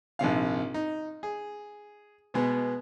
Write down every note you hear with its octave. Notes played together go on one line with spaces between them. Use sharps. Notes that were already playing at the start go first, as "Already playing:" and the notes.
A#1 G#2 C3 F5
D#4
G#4
B2 G#3 B3